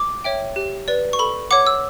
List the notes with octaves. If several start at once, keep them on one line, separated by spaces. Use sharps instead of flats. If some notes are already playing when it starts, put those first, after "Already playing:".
Already playing: D6
C#5 E5 G5
G4
B4 D5
C#6
A4 B5
C#5 F#5 D6
E6